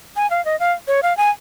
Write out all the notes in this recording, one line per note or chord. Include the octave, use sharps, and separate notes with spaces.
G#5
F5
D#5
F5
C#5
F5
G#5